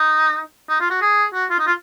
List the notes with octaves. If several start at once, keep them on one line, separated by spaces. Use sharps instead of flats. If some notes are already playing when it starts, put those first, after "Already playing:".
Already playing: D#4
D#4
F4
F#4
G#4
F#4
F4
D#4
F4